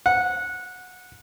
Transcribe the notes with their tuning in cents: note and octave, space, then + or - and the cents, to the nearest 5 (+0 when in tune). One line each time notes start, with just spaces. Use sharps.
F#5 -15